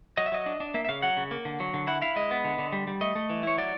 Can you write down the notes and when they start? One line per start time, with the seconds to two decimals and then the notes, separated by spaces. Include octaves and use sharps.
0.17 F#3 D#5
0.26 E5
0.32 F#3 D#5
0.46 D4
0.60 D4
0.74 A#3 E5
0.85 E5
0.89 C#3 F5
1.02 F#3 F#5
1.17 C#3
1.31 A#3
1.45 D3
1.60 F#3
1.74 D3
1.87 E4 F#5
2.02 E4 F5
2.16 G#3 D#5
2.31 B3
2.45 D3
2.59 D3
2.72 G3
2.87 G3
3.01 A3 D#5
3.15 A3
3.30 E3
3.43 E4 C#5
3.58 F#3 D5